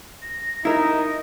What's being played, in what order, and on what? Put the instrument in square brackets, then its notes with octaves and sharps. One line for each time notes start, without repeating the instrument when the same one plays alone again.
[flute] A#6
[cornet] D#4 [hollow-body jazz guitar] E4 A#4 [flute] A#6